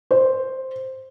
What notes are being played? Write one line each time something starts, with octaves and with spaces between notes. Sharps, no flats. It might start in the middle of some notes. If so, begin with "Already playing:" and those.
C5